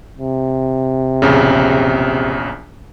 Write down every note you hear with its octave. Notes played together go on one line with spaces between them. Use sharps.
C3
A#1 E2 C#3